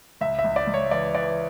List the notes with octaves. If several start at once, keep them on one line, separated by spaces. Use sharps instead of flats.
C#2 E5
E5
C#2
D5
C#2
C#5
E3 D5
E3 D5